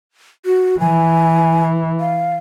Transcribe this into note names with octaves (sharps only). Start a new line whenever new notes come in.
F#4
E3 G#5
F5